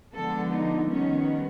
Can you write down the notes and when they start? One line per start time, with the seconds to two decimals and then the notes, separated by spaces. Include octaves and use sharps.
0.14 D3 F3 G#3 B3 A4
0.52 D#4
0.89 D#3 G3 B3 C#4